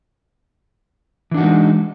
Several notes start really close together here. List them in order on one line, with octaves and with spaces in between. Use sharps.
E3 D4 F#4 D#4 G#3